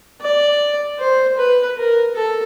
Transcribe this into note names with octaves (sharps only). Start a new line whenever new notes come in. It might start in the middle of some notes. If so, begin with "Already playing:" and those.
D5
C5
B4
A#4
A4